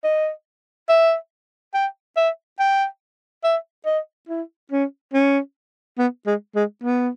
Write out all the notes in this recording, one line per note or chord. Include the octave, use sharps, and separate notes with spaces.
D#5
E5
G5
E5
G5
E5
D#5
E4
C#4
C#4
B3
G#3
G#3
B3